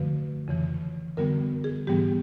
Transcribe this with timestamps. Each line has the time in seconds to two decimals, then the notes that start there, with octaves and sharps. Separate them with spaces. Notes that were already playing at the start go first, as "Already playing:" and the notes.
Already playing: F#2 D3 F3 A3 B4
0.48 F2 C#3 E3
1.17 F#2 D3 G3 B3 A#4
1.64 G#4
1.87 G#2 E3 G3 B3 G4